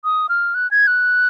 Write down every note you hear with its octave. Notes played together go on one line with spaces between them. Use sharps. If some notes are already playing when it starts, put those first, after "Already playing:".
D#6
F6
F#6
G#6
F#6